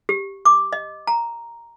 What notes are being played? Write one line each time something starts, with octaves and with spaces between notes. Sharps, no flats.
G4
D6
D#5
A#5